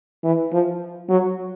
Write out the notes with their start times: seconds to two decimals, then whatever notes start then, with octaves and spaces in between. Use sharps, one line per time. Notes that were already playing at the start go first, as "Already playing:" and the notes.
0.24 E3
0.53 F3
1.09 F#3